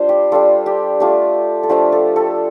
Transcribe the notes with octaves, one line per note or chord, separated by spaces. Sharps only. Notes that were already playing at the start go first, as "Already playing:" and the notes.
Already playing: G3 D4 F4 C5
G4
G3 D4 F4 A4
G4
A3 D4 F4 G4
A4
F3 A3 D4 F4 G4
A4
A4